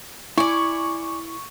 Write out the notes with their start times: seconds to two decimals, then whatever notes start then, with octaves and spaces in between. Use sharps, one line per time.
0.38 E4 D5 G#5 C#6